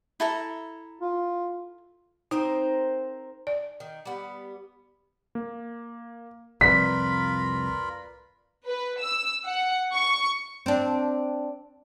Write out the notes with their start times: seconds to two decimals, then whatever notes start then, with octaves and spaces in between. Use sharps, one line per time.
0.20 E4 A4 A#5
1.01 F4
2.31 C4 D#4 A#4 C5
3.47 D5
3.80 D#3
4.05 G3 B3
5.35 A#3
6.61 C2 F2 F4 A#4 B4 D5 B5 B6
8.66 B4
9.01 E6
9.44 F#5
9.93 C#6
10.66 C4 D4